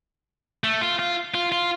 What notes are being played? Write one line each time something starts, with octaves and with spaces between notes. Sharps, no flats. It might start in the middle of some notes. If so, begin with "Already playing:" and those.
A3
F4
F4
F4
F4